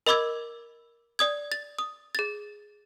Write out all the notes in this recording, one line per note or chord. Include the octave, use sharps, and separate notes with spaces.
A#4 D#5 B5 D6 E6 G#6
D5 D#6 G#6
A6
D#6
G#4 A6